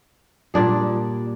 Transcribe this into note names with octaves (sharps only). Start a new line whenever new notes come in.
A#2 G3 D4 G#4